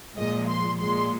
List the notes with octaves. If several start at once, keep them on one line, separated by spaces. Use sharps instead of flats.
A#2 F3 G#3 D#5
C6
A#2 G#3 C6